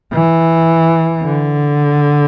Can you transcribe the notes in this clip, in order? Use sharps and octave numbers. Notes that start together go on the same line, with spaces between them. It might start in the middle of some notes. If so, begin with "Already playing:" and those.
E3
D3